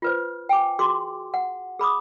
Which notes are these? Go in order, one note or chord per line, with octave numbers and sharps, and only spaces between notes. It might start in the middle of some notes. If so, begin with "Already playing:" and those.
F4 B4 C5
G5 G#5 D6
F#4 G#4 C6 D6
F#5
G#4 B5 D6 D#6